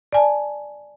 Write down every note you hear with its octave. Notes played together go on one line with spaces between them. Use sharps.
D5 G#5 A5